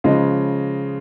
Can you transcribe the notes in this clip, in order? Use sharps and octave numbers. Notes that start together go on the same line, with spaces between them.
C#3 F3 G#3 D#5